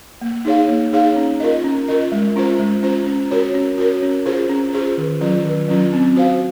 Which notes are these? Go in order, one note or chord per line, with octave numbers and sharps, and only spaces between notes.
A#3
D#4 G#4 C#5 F5
A#3
D#4 G#4 C#5 F5
C#4
F4 A#4 D#5
C#4
F4 A#4 D#5
G#3
C#4 F4 C5
G#3
C#4 F4 C5
C#4
F#4 A#4 C#5
C#4
F#4 A#4 C#5
C#4
F4 G#4 C5
C#4
F4 G#4 C5
D#3
F#3 C#4 F4
D#3
F#3 C#4 F4
C4
F#4 C5 F5